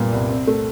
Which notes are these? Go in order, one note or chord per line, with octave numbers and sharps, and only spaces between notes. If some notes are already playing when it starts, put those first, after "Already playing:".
Already playing: A#2 G3 B3
C2
C4
A3